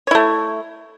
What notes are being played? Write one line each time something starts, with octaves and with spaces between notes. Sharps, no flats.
A3 E4 C#5